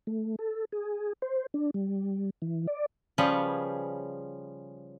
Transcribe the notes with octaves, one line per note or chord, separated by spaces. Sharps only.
A3
A4
G#4
C5
D4
G3
E3
D5
C#3 F3 G3 C#4 G#4 B4